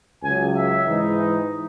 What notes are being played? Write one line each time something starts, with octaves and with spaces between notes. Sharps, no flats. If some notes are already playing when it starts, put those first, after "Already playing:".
C#2 C#3 F#3 G#5
E5
G#2 E3 G#3 D#4